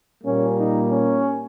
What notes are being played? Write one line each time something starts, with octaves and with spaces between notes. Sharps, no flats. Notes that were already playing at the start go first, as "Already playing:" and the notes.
A#2 G3 A#3 C#4
D#4
C#4